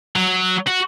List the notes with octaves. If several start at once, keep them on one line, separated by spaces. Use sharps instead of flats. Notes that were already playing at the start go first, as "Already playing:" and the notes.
F#3
F#4